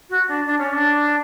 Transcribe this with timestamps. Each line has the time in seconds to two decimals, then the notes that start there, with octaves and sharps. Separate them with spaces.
0.10 F#4
0.28 D4
0.46 D4
0.58 C#4
0.73 D4